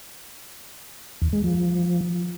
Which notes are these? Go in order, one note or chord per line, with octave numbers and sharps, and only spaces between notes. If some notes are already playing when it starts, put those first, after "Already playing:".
E2
G#3
F3